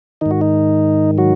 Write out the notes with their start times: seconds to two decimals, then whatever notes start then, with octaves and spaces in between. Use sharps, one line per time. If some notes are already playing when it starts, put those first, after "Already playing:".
0.21 G#2 D#3 D#4
0.31 F#4
0.41 D#4
1.18 F#3 F#4